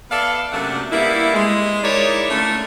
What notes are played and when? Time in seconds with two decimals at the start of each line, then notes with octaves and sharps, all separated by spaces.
0.10 B3 A4 D5 E5 F5
0.52 F#2 C3 A3 A#3 D4 F#5
0.91 G3 A#3 B3 E4
1.34 G#3
1.82 D#4 E4 A#4 C#5 D5
2.29 D3 A3 A#3 C#4